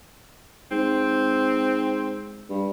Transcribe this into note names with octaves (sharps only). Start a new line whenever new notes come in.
G#2 C4
G2